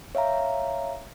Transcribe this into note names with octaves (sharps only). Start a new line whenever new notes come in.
C#5 E5 F5 A#5